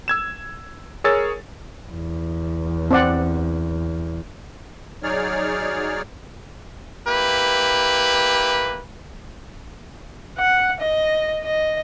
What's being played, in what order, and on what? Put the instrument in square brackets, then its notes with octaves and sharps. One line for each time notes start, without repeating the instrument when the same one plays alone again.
[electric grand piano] E6 G#6 E7
G#4 A#4 C#5 E6 A6
[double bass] E2
[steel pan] C4 D5 F#5
[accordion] F#3 D#4 G#4 C#5 D5 F6
[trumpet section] A#3 E4 G4 B4
[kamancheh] F#5
D#5
D#5